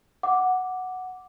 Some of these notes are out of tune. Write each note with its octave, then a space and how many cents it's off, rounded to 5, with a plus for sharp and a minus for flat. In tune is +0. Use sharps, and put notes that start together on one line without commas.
F#5 +0 D6 +0